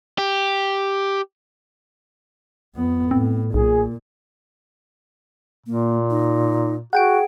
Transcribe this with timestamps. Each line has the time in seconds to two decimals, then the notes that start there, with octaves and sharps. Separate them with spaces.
0.18 G4
2.75 F2 B3
3.11 A2 C4
3.54 B1 A#2 G#4
5.66 A#2 A#3
6.10 D#4
6.93 F#4 G#4 F#5 G5 D7